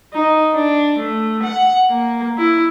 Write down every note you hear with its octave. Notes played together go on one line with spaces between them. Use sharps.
D#4
D4
A3
F#5
A#3
E4